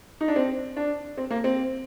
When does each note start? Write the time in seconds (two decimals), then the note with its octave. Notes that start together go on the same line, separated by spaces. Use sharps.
0.21 D#4
0.28 D4
0.36 C4
0.77 D4
1.17 C4
1.31 A#3
1.44 C4